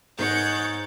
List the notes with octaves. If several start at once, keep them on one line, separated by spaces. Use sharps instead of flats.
G#2 D#4 G#4 A#4 C#5 F#5 G6 A6